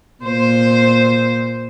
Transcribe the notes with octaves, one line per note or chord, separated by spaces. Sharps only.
A#2 C5